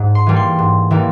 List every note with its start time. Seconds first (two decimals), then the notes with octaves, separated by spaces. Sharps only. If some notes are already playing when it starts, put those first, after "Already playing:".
Already playing: G#2
0.15 C6
0.26 E3 G3 A#3
0.36 C6
0.59 G#2
0.91 E3 G3 A#3